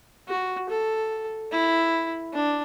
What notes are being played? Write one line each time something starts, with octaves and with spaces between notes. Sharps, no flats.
F#4
A4
E4
D4